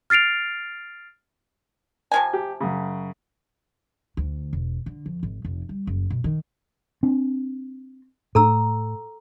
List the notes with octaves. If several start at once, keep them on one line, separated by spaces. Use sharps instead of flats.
F6 A6 C7 D7 F7
C3 F3 G#5
G4
F#2 C#3
D2
E1
D3
F2
G#1
F1
G3
F#1
B2
D#3
C4 D4
A2 A4 A#5 E6